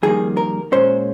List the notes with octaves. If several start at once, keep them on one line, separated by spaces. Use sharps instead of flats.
F2 D#3 G3 A#3 G#4
A#4
A#2 G#3 C#4 C5